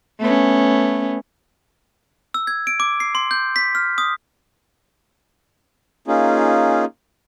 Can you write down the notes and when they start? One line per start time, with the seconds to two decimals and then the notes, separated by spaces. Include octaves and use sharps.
0.19 A3 B3 C#4
2.34 E6
2.47 G#6
2.67 D7
2.80 D6
3.00 C7
3.15 C6
3.31 G6
3.56 B6
3.75 F6
3.98 D#6
6.07 A#3 C#4 D#4 F4 G#4